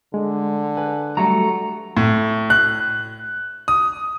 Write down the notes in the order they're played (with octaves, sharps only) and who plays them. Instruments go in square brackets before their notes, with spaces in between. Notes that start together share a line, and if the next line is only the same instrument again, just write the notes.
[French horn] D3 [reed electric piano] G#3
[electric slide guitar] B4 [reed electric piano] G#5
[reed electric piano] F#3 G3 [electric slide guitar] A3 F#4 A#5
[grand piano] A2
F#6
D#6